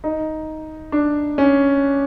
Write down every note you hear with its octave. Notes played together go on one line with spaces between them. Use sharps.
D#4
D4
C#4